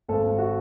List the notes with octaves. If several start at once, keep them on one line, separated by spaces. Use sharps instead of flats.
G#1 A4
G#1
F#4